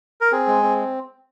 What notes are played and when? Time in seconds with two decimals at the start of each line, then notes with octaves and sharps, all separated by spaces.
0.21 A#4
0.32 C4 G#4
0.47 G#3
0.63 C4